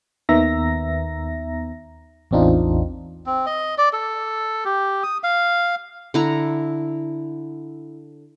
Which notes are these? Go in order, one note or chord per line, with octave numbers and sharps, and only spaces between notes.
D#2 D#3 B3 E5 A#5 A#6
A1 E2 C4 D4 D#4 F4
C4
D#5
D5
A4
G4
D#6
F5
D3 E4 A#5